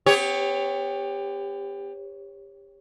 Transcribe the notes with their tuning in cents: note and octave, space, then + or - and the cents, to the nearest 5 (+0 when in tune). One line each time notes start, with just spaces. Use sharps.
B3 +45 G4 +25 C#5 +0